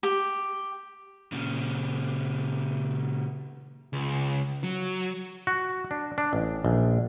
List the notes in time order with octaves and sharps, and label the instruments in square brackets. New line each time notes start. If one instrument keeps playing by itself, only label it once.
[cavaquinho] G4
[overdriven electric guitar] A#2 C#3
[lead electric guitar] C#2
F#3
[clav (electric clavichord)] F#4
D4
D4
A1
A#1